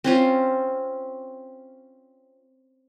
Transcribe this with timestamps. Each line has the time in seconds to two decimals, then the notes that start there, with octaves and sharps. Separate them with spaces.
0.04 C4 C#4 F4